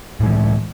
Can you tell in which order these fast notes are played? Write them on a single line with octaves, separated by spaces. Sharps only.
A2 G#3 E3